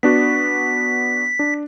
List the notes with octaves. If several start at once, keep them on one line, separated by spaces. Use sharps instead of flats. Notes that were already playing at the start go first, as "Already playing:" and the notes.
B3 D4 F#4 B6
D4